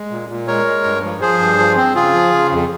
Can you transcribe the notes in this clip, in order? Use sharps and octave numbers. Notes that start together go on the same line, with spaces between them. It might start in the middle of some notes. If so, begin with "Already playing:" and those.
Already playing: G#3
A#2
A#2
G#3 A#4 C#5
G#3
G2
F3
F3 G#4 C5
G2
F3
C4
C#3 F4 G#4
F3
C#3
F2